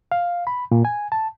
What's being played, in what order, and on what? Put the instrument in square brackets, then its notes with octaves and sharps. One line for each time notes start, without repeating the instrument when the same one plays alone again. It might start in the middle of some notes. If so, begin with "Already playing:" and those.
[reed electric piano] F5
B5
A#2
G#5
A5